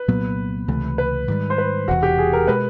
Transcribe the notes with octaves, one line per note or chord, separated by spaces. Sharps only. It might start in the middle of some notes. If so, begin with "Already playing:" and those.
Already playing: B4
C2 A#2 F#3 B3
C#2 C3 E3 A3
B4
G#2 D#3 G3
C5
B4
E1 E2 C3 F#4
G4
G#4
A#4
B2 G#3 B4